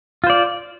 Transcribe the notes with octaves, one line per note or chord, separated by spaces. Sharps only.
F4 C5 D5